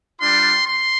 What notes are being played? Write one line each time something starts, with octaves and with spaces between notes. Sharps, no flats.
G3 D4 F4 C6
C6